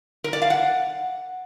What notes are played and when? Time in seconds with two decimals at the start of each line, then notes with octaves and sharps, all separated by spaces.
0.24 A#4
0.33 D5
0.42 F5
0.50 F#5